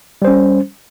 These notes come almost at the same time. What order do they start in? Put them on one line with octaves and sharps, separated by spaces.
G3 C5 C#4